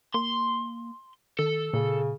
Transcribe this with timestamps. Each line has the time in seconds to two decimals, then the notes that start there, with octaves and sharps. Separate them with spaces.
0.14 A#3 C6
1.39 D#3 A4
1.74 A#2 C#3